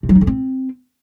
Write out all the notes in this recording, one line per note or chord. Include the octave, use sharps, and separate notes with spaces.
C3
F#3
D#4
D3
C4